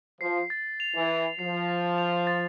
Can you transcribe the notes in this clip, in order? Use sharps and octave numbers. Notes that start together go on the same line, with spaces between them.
F3 C7
A6
F7
E3
A6
F3 C7
A6
F7
A6